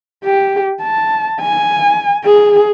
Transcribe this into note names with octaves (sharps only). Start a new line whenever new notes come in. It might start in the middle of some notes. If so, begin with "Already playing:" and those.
G4
A5
G#5
G#4